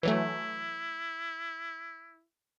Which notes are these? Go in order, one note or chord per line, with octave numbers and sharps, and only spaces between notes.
E3 F#3 A3 E4